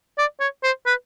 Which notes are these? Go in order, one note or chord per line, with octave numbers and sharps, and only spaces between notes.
D5
C#5
C5
B4